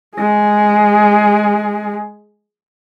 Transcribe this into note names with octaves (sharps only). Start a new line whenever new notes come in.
G#3 G#4